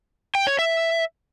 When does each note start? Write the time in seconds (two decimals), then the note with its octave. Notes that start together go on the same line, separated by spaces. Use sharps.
0.35 G5
0.47 C#5
0.59 E5